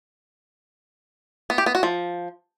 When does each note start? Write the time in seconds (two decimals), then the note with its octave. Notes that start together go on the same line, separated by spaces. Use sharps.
1.50 B3
1.58 G4
1.66 B3
1.75 F#4
1.83 F3